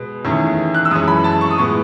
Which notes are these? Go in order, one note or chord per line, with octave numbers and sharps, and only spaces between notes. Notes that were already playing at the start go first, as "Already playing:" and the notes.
Already playing: B2 G#3 B3
E2 D#3 A3 C#4
F#6
E6
F#2 E3 G#3 C#4 D#6
B5
A5
C#6
D#6
A2 G#3 B3 C#6